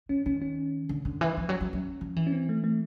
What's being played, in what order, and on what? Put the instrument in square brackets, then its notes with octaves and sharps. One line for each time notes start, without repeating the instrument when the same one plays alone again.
[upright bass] D#3 [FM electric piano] C#4
[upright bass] D#3 [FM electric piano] C#4
[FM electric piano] C#4
[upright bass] D3
D3
E3
F3
F#3
F#3
F#3
F3
E3
[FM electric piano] C#4
C4
A3
A3